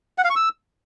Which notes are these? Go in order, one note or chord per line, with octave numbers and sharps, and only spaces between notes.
F#5
F5
C#6
E6